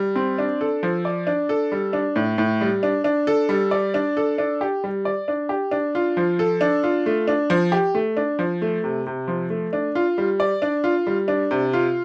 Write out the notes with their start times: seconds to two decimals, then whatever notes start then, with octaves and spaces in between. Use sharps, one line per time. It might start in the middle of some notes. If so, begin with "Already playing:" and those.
Already playing: G3
0.16 C4
0.38 D4
0.61 A4
0.83 F3
1.05 D5
1.27 D4
1.49 A4
1.72 G3
1.93 D4
2.16 A2
2.38 A2
2.61 G3
2.83 D4
3.04 D4
3.27 A4
3.49 G3
3.71 D5
3.94 D4
4.17 A4
4.38 D4
4.61 G4
4.84 G3
5.05 D5
5.28 D4
5.49 G4
5.71 D4
5.95 F4
6.17 F3
6.39 A4
6.61 D4
6.83 F4
7.06 A3
7.28 D4
7.50 F3
7.72 G4
7.95 A3
8.17 D4
8.39 F3
8.62 A3
8.84 C3
9.07 C3
9.28 F3
9.50 A3
9.73 D4
9.95 F4
10.18 G3
10.40 D5
10.62 D4
10.84 F4
11.07 G3
11.28 D4
11.51 C3
11.73 F4